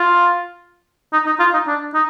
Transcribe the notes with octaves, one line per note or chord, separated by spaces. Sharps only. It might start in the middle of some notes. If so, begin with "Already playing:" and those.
Already playing: F4
D#4
D#4
F4
D#4
D4
D#4